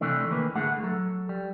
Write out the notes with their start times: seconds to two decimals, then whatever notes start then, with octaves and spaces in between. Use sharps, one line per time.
0.01 C3 E3 A3 D4
0.31 D#3 E3 A#3 B4
0.55 A2 D3 A3 G#4 F#5
0.83 F#3 A4
1.29 G3